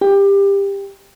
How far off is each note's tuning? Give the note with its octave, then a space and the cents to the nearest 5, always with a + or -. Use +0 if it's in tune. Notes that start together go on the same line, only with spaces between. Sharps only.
G4 +20